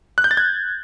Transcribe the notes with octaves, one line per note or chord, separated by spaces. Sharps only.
F#6
G6
A6
G#6